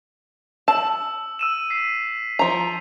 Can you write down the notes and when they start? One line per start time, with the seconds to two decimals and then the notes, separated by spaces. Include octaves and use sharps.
0.68 A5 E6
1.39 E6 D#7 E7
1.70 B6 C7
2.39 F3 A#5